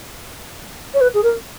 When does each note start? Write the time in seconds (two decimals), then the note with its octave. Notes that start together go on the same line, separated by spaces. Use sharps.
0.94 C#5
1.01 B4
1.14 G#4
1.23 A#4